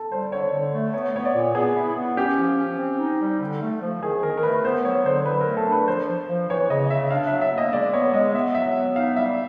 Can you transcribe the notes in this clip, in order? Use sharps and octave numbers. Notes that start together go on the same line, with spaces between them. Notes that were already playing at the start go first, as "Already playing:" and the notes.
Already playing: A4
G3 C5
D3 C#5
D3
A3
B3 C#5
B3 C#5
D5
A#2
B3 G#4
E4
B3
C#4 G4
F3
C#4
C4
D#4
G3
D3
A3
F3
D#3 G#4
D#3 A#4
A#4
A3 B4
B3 C5
F#3 C#5
D3 C5
F#3 B4
A#4
A3
A4
D4
B4
F3 C5
F3
F3
E3 C#5
C#3 D#5
C#3 E5
D4 F5
E5
F#3
E5
A#3 D#5
G#3 D5
B3 C#5
G#3 D#5
B3 E5
F#3 E5
B3
D#4 F5
G3 E5